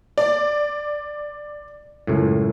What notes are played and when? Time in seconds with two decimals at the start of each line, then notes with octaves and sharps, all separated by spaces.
0.18 D5
2.07 C#2 F#2 A2